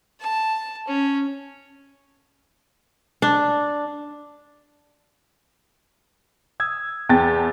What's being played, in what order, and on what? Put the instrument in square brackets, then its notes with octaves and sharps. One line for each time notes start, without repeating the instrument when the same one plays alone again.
[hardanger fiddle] A5
C#4
[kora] D4
[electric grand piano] D#6 E6 G#6
[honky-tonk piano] E2 [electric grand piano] G5 A5 A6